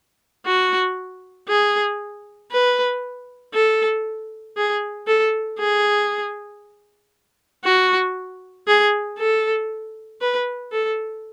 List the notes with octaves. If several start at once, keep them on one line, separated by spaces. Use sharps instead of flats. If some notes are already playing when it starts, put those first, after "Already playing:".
F#4
G#4
B4
A4
G#4
A4
G#4
F#4
G#4
A4
B4
A4